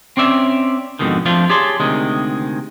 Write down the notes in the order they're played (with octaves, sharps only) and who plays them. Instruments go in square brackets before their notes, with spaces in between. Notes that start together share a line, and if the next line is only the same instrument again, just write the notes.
[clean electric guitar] C4 C#4 D5 E5
F2 G#2 B2 D3 D#3
F2 F3 A3 D4 F4
G4 G#4 C#5 D5 A5 C6
D2 C3 D#3 G#3